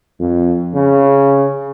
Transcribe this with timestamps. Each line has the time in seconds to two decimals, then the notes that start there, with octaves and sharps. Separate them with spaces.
0.20 F2
0.75 C#3